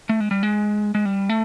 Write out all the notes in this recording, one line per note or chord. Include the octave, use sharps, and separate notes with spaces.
A3
G#3
G3
G#3
G#3
G3
A3